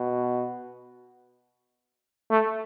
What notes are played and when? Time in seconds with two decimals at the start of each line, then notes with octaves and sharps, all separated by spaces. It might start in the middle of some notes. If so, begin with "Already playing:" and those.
Already playing: B2
2.30 A3